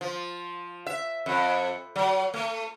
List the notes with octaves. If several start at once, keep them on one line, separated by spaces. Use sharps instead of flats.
F3
E5
F2
F#3
A3